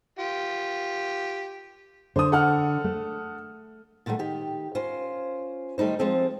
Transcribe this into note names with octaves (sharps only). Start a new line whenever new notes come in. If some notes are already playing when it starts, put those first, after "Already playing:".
F4 G4
D3 C5 D#6
A4 F#5 F6
A3
A#2 D3 D#3 F#3 A3
D#3 G4
C#4 F4 A#4 C5
D#3 G3 A3 D#4 C5
F3 G#3 C4 A4